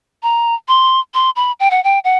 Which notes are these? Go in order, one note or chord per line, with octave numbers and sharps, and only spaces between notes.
A#5
C6
C6
B5
G5
F#5
G5
F#5